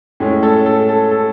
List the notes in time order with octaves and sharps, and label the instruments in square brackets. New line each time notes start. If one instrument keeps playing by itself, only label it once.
[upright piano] A2 G#3 C#4
A4 C#5
A4
A4
A4